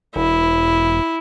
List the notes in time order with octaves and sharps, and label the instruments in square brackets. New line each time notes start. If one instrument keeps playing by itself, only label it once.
[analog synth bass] E1 [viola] E4